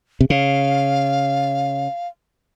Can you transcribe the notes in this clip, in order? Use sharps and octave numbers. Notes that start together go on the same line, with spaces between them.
C3
C#3 F5